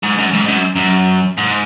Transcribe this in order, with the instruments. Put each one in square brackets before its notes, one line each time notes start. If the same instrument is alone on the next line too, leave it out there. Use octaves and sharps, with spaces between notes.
[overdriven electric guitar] G#2
F#2
G#2
F#2
F#2
G#2